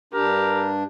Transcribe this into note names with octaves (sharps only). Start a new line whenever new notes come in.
G2 D4 G4 A#4